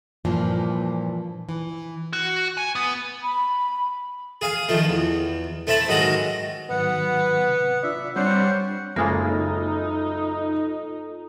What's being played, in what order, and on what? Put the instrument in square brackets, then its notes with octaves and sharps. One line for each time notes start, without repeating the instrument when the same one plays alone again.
[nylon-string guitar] G2 A#2 E3 F3 A#3
E3
[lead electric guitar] F#4
G#5
B3
[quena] B5
[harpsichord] G#4 F5 G#5
D#3 F3 A3
E2
A3 C4 E5 A5 B5
G#2 D#3 F#3 G#3 F#4 A#5
[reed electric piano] G#2 D#3 F#3 [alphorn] B3 [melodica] F#5
[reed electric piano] C3
[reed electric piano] D4 F4 D5 [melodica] E5
[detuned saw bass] G3 [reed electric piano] C4 D4 [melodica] C5 F#5 [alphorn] C#5
[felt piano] F#1 [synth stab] C#3 G#3 A#3 [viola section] D#4 [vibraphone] F4 A4 A#5